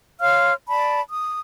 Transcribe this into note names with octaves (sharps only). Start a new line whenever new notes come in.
C#5 F5 C6 F6
D5 A5 B5
D#6